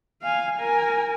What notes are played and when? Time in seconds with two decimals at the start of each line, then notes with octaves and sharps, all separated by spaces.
0.22 F5 G#5
0.56 A#4 G#5